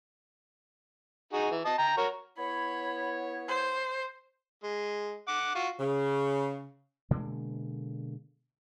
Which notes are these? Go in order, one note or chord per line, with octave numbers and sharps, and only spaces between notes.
D#4 F#4 G#4
E3
D#5 A5 D#6
G5 A#5
F#4 A#4 C#5
B3 E4 C#5 B5
C5
G#3
F#5 D6
F4 F#4
C#3
B2 D3 G#3 A#3